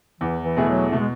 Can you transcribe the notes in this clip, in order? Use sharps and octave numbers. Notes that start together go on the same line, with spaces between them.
E2 E3
E3
B2 E3 A3 E4 G#4
F#3
B2 A3
G#3